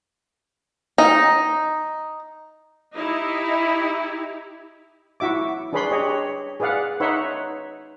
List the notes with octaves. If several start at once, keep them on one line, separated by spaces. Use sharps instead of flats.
D#4
D#4 E4 G4
E4 F#4 E5 D6
D4 G#4 B4 C#5 B5 C6
G4 G#4 C#5 D#5
G#4 B4 D5 F5 F#5
D#4 B4 C#5 E5 F#5 C6